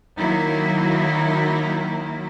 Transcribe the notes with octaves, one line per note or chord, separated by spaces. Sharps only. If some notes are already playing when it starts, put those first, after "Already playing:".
D#3 F#3 A#3 E4